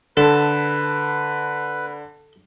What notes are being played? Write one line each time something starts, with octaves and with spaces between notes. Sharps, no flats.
D3 A4 B4